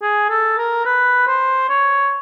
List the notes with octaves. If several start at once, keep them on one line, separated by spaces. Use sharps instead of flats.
G#4
A4
A#4
B4
C5
C#5